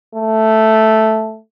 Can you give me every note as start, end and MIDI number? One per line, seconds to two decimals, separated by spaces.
0.15 1.39 57